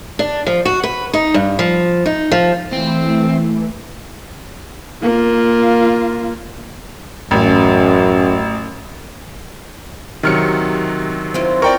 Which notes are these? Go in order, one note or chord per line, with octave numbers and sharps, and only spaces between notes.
D4
F3
F#4
B4
D#4
G2
F3
D#4
F3
E3 A3 C4
A#3 F4
A1 F#2
C3 D#3 F#3 F6 C#7
C4 E4 F4
A#4 D5 G5 C#6